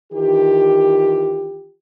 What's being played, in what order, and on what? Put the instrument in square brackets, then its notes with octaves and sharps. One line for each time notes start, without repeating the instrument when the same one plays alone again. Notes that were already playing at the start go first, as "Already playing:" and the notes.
[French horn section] D#3 E3 F4 G4